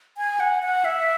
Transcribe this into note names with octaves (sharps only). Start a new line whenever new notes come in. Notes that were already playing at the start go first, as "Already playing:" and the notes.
G#5
F#5
F#5
E5